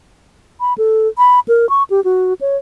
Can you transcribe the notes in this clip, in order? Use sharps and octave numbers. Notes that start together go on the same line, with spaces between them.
B5
A4
B5
A#4
C#6
G4
F#4
C#5